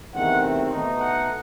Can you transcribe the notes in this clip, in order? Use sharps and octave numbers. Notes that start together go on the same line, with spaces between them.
E2 C3 D#3 A3 C4 F#5
B2 A3 D#4
F#5